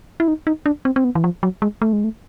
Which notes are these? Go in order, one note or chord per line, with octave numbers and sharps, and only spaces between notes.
E4
D#4
D#4
D4
C4
C4
B3
E3
F3
F#3
G#3
A3
G#3
A3